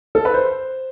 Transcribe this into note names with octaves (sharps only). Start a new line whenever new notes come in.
A4
B4
C5